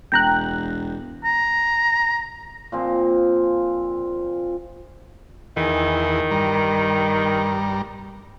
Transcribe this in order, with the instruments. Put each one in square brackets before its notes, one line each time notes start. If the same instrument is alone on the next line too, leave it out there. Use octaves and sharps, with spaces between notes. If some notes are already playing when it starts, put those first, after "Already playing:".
[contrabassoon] E1 [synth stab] G5 A#5 F#6
[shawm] A#5
[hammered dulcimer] A#2 F3 C4
[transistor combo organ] E2 E3 G#4 [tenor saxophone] D#3
[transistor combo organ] G2 G3 A#5